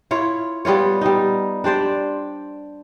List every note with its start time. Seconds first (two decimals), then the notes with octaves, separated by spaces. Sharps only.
0.11 E4 F4 C#5
0.65 G3 B3 F4 C#5
1.01 G3 D#4
1.64 D4 G4 C5 D5